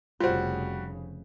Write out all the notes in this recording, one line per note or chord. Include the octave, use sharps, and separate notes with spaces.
F1 C#3 G3 F4 F#4 C5